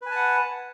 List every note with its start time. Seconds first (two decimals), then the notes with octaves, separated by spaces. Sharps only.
0.02 B4
0.06 G#5
0.11 A5
0.16 F#5